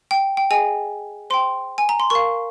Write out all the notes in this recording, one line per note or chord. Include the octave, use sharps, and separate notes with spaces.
G5
G5
G#4 D#5 G5 G#5
C5 G5 C6
G#5
A#5
C6
A#4 F5 C#6